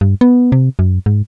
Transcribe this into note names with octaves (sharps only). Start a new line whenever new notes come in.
G2
B3
C3
F#2
G#2